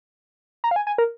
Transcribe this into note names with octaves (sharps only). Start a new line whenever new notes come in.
A#5
F5
G#5
G#5
A#4